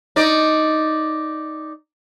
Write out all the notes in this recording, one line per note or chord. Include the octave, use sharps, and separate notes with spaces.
D#4 D5